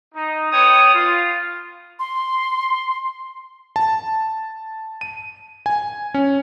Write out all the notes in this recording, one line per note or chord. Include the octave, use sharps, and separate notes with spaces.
D#4
B3 C#5 G5 D#6
F4
C6
A5
D#7
G#5
C#4